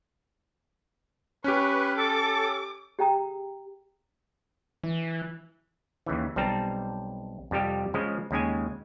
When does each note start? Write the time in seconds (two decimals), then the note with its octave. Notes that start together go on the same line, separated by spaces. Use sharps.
1.44 C#4 G4 B4 C#6
1.97 A4 D6
2.99 G4 G#4 G5 A#5 D#6
4.83 E3
6.06 D#2 C#3 E3
6.36 B1 G3 C4 A5 A#5
7.51 F2 C3 G3 G4
7.94 C#3 F3 G#3
8.31 D#2 C#3 G#3 G#5